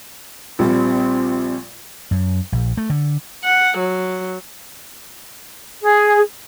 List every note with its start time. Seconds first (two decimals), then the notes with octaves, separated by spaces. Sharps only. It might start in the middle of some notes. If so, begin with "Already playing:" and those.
0.59 A#1 A#2 G3 C4
2.11 F#2
2.52 A#1
2.77 A3
2.90 D3
3.44 F#5
3.79 F#3
5.82 G#4